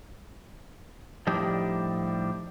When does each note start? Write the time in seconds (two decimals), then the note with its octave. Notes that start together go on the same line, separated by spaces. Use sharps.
1.27 A2 F3 G3 D4 D#4 G4